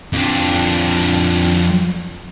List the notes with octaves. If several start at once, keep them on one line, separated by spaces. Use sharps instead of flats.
F2 D4